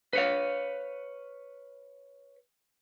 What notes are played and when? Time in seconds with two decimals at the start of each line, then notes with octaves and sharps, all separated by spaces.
0.13 B4 C#5 F5